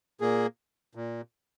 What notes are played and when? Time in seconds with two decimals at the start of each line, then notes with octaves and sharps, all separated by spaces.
0.20 A#2 A#3 G#4
0.95 A#2